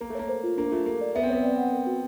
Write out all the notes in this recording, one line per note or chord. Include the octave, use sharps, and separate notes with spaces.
A#3 A#4
A3
A#3 C#5
C5
F4
A#3 D4
A3 F4
A#3 G4
D5
B3 E5
C4
B3 C#5
C4 D5
F#5
A#4
F#4